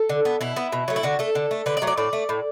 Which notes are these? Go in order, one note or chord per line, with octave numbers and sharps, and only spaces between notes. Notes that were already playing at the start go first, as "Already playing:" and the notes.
Already playing: A4
D3
B3
B2 E4
B3
B2
F#3 A3
E4
D3 F#4
A3 A4
D3
A3
D3 B4
D5
F#3 A3
D5
A2 D5
A3
A2